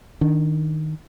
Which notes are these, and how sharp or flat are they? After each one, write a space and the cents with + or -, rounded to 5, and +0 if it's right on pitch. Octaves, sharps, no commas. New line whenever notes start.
D#3 +0 D4 +0